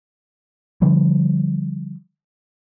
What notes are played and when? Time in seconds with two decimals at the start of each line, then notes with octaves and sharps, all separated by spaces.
0.82 D3 F3 G3